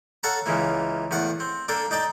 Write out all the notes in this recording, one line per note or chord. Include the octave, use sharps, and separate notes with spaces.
A4 C#5 F5 F#5 A5 A#5
C#2 C#3 E3 A#3
E2 A2 F5 F#5
C4
A#3 D4 A4 G5
D#4 D5 G5 A5